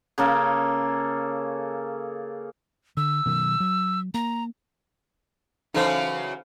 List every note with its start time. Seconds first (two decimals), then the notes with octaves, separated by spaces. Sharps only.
0.18 C#3 A#3 A4
2.97 D3 E6
3.26 B2 D#3 F#3
3.60 F#3
4.14 A#3 A#5
5.74 C#3 E3 F#3 D#4 A4 C5 F5